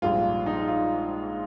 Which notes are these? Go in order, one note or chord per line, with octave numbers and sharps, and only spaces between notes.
A#1 G#2 G3 F4
D#4
F4